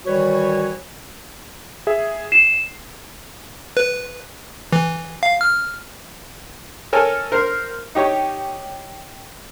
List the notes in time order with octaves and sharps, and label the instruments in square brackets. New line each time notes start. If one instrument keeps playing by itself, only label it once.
[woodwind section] D#3 E3 G3 F#4 B4 C#5
[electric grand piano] G#4 E5
[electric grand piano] C7 [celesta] E7
[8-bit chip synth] B4
E3
F5
F6
[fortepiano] A4 A#4 C#5 G#5
A#4 C5
D#4 G4 C#5 C#6